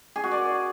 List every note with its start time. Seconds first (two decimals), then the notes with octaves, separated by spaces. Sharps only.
0.16 G#4
0.24 F#4
0.31 D5